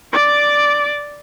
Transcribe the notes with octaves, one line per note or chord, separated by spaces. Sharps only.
D5 D6